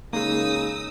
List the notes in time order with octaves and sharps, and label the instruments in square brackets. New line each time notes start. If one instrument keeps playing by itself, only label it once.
[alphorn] C#3 [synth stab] G#3 A#3 [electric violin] D#4 [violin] D#6 E6